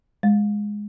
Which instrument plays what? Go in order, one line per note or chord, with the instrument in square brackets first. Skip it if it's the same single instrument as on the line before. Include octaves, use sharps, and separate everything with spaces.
[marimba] G#3